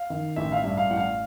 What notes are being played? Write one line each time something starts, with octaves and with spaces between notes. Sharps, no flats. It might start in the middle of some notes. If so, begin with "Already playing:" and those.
Already playing: F5
D#3
A1 E5
F5
E5
G2
F5
A1 F#5
F5